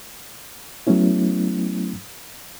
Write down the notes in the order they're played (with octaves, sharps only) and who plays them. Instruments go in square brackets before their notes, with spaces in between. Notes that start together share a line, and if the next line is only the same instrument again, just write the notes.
[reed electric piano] F#3 A3 B3 C#4 E4